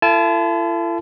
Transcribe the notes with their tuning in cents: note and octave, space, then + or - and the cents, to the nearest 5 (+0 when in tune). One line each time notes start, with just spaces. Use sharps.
E4 +45 A4 +30 A5 -25